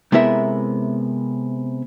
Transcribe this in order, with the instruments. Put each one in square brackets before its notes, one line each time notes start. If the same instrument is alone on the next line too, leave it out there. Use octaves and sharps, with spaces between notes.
[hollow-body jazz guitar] C3 G#3 B3 E4 A#4 E5